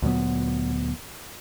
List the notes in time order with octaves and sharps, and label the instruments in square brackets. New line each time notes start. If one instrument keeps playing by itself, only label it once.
[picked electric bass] D2 A#2 F#3 B3